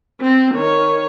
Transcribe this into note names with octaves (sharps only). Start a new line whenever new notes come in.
C4
D#3 C#5